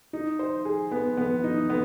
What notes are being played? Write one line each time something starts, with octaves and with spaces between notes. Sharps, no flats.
D#4
C5
G#4
B3
B3
D#4
B3